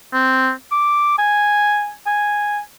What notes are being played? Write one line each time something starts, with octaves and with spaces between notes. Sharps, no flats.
C4
D6
G#5
G#5